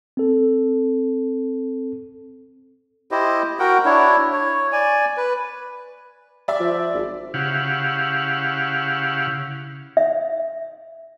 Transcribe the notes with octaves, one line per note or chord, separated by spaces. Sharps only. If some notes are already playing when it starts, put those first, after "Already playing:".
C4 A4
E4 G4 C5 D#5
F#4 A#4 F#5 G5
D4 E4 C#5
C#5
D5 G#5
B4
D5 E5 D6
F3
G#1
C#3 E4 G4 F5 F#5
E5